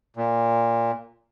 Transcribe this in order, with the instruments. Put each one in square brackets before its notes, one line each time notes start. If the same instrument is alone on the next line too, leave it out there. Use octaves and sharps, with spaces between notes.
[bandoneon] A#2